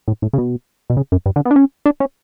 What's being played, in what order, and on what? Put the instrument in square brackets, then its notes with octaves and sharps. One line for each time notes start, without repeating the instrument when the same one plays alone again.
[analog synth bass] A2
A2
C#3
B2
B2
C#3
F#2
G2
D3
B3
D4
C#4
D4
C#4